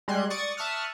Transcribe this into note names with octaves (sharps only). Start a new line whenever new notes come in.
G3 G#3 C6 F#6 G#6
D5 C#6 D#6 A6 C#7
E5 A5 C#6 D#6 F6 F#6